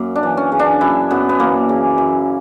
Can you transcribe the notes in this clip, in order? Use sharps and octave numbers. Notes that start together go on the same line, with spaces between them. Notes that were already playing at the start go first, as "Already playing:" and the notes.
Already playing: F#2 A#3
D4
E3
C#4
C#3
D4
F#2 E4
F#2 B3
B3
E3 A#3
C#3
F#2